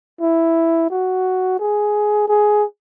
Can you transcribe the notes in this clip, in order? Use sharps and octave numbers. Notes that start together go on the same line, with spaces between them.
E4
F#4
G#4
G#4